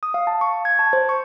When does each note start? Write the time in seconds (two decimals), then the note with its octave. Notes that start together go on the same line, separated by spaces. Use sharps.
0.03 D#6
0.14 F5
0.27 A5
0.41 C#6
0.65 G#6
0.79 A5
0.93 C5
1.09 C#6